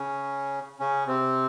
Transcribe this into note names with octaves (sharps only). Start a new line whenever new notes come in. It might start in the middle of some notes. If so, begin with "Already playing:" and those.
Already playing: C#3 C#4
C#3 C#4
C3 C4